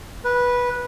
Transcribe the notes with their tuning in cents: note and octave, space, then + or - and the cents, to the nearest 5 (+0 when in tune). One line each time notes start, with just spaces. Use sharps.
B4 -15